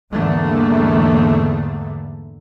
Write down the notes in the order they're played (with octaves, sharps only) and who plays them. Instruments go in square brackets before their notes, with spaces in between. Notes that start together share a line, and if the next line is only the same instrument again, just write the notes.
[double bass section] E2 G#2 D3 G3 A3 A#3